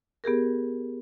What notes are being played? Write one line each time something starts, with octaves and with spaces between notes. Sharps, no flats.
B3 G4 G#4 A#4